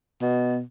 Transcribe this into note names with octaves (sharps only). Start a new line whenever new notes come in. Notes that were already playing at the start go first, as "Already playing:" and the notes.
B2